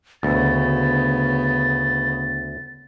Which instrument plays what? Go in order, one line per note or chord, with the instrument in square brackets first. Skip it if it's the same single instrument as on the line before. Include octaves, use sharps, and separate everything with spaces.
[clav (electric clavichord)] D2 [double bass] C#3 B3 [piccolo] A6